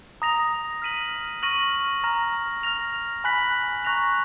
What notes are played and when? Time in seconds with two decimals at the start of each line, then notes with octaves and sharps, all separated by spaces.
0.22 A#5 D#6 A#6 F7
0.82 F6 B6 D#7 F#7
1.43 C#6 F6 A#6 D#7 F#7
2.04 A#5 F6 A#6
2.63 F6 A#6 F7
3.24 G#5 B5 F#6 B6 F#7
3.85 A#5 C#6 F#6 A#6 F7